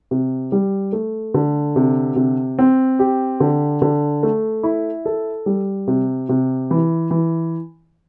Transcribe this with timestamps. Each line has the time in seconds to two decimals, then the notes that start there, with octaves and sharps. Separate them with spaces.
0.11 C3
0.52 G3
0.93 A3
1.34 D3
1.76 C3
2.16 C3
2.59 C4
2.99 G4
3.40 D3
3.82 D3
4.23 A3
4.63 E4
5.06 A4
5.46 G3
5.88 C3
6.29 C3
6.71 E3
7.11 E3